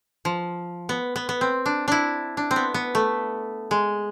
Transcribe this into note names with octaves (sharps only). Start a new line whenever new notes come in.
F3
B3
B3
B3
C4
D4
D4 E4
D4
C4
B3
B3
A3
G#3